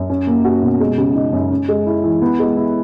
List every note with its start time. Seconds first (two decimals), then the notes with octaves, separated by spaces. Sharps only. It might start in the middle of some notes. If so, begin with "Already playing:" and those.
Already playing: F#2
0.10 C#4
0.27 A#3
0.45 F#4
0.62 B2
0.80 G#3
0.98 C#3
1.15 D#4
1.33 F#2
1.51 C#4
1.68 G#3
1.86 E4
2.04 E3
2.22 B3
2.39 G#3
2.57 E4